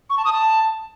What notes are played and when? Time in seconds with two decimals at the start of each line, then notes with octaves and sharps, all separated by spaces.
0.09 C#6
0.17 A5
0.25 D#6
0.32 A5